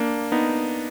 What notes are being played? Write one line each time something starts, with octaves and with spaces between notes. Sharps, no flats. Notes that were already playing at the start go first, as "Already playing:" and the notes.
Already playing: A#3 D4
B3 D#4